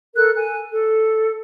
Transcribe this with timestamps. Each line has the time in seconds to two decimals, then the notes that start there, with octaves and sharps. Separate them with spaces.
0.16 A4 A#4 F#6
0.35 G#5
0.72 A4